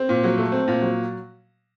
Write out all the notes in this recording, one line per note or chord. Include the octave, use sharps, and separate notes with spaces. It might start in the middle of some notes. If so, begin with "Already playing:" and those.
Already playing: C4
A#2
F#3
A3
C4
A#2
F#3